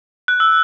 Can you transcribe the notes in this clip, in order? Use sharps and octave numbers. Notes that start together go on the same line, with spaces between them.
F#6
E6